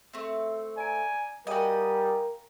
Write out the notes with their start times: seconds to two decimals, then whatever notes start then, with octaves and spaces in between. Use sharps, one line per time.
0.13 A3 C4
0.77 D5 G#5 A#5 D7
1.47 G3 F#4 A#4 D#5 F5 G5 G#5